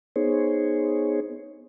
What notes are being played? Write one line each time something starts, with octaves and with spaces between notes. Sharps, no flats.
B3 D#4 G#4 C5 C#5